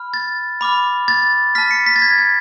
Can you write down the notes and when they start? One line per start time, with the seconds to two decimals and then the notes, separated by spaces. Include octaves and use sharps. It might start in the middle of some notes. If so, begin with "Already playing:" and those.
Already playing: B5 F6
0.14 A6
0.61 B5 D6 F6
1.08 A6
1.55 A5 F6 B6
1.71 C#7
1.86 B6
1.96 A6
2.02 G#6
2.18 G#6